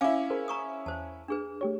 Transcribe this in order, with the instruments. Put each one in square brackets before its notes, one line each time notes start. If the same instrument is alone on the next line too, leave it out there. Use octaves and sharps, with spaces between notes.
[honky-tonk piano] C#4 E4 [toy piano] F5 D6
[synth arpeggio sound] G#4 A#4 C5
[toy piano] A#5 C#6 D#6
[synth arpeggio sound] E2 [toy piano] C5 A5
[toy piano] D4 G#4 B4
[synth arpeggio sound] A3 G4 C#5